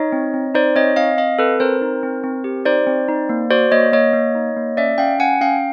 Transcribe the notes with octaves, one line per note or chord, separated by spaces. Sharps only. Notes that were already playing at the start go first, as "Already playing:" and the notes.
Already playing: D#4 C#5 D#5
C4
C4
D#4 C5 D5
C4 C#5 D#5
C4 D#5 F5
C4 D#5 F5
C4 A4 B4
C4 A#4 C5
D#4
C4
C4
G4
D#4 C5 D5
C4
D#4
A#3
F#4 C5 D5
A#3 C#5 D#5
A#3 C#5 D#5
A#3
D#4
A#3
C#4 D5 E5
C#4 F5 G5
C#4 F#5 G#5
C#4 F5 G5